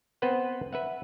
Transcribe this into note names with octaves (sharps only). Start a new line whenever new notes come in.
B3 C4 B4 C5 F#5
B4 E5 F#5